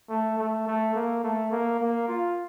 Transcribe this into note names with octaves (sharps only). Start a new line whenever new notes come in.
A3
A3
A3
A#3
A3
A#3
A#3
F4